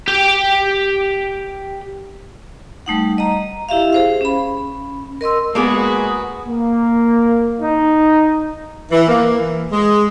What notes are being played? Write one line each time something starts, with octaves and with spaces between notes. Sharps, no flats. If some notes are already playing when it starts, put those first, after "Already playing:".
G4 G5
G3 A3 D#4 F#5
D#5 A#5
E4 G4 E5 F5
G#4 C5 F5
C#4 B5
A#4 D#5 C6 E6
G#3 A#3 B3 F#4 G#4 B4 G#5 D#6
A#3
D#4
E3
A#3
E3
G#3